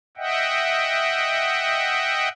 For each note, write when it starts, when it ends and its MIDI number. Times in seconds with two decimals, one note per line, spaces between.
0.17 2.29 75
0.17 2.29 76
0.17 2.29 78
0.17 2.29 79